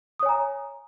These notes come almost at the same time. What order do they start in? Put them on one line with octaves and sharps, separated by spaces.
D#6 C#5 G#5 A#5